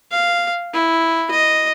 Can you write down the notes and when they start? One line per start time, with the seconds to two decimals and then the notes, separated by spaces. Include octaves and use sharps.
0.12 F5
0.74 E4
1.31 D#5